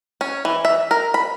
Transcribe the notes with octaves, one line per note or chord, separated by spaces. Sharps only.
C#4
E3
E5
A#4
B5